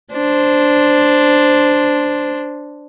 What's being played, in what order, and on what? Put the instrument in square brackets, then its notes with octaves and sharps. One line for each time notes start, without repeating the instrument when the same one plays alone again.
[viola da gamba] D4 C5